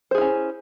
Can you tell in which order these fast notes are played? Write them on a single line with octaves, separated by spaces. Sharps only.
C5 G#4 E4 C#4